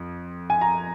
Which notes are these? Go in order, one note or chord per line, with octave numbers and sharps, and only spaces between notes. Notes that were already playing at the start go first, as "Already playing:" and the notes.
Already playing: F2
G#5
A#5